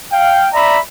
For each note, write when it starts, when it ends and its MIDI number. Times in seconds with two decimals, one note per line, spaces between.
0.12 0.48 77
0.12 0.48 79
0.53 0.79 74
0.53 0.79 76
0.53 0.79 82
0.53 0.79 83